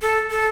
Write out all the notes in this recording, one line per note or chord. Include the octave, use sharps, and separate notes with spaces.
A4
A4